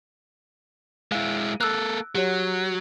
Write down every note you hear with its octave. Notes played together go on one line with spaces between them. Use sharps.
G#3 E4 F5
A#3 A4 E6 F#6
F#3 G4 C#5